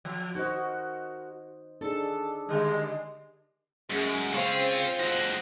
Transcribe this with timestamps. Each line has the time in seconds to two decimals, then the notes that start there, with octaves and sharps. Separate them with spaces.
0.05 F3
0.35 D#4 F#4 A#4 C5 D#5
1.81 D4 D#4 G#4 A4
2.49 D3 G3 G#3
3.90 F#2 G#3
4.33 C4 F4 G#4 C#5
5.00 G#3 F#4